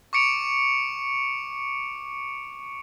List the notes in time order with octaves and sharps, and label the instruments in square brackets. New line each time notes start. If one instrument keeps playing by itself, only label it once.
[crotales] C#6 D6 C#7 D7 F7